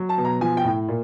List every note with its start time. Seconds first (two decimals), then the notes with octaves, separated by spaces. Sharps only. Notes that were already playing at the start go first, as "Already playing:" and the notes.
Already playing: F#3
0.09 A5
0.18 B2
0.25 A#5
0.41 F3 G#5
0.57 G5
0.64 A2
0.88 A#2